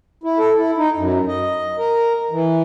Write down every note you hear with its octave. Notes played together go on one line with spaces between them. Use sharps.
E4
A4
E4
D#4
F#2
D#5
A#4
E3